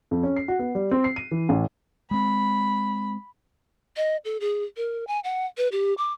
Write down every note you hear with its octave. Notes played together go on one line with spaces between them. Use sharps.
F2
C#4
C7
F#4
B3
G3
C4
C7
D#7
E3
A1
G#3 C4 B5
D#5
A4
G#4
A#4
G#5
F#5
B4
G4
D6